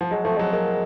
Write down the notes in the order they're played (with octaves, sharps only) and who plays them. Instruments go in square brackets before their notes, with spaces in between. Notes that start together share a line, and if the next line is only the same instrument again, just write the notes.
[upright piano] F3
[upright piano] F#3 [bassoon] G#3
[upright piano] F3 [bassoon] A3
[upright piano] F#3 [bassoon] G#3
[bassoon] G#3 [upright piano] A#3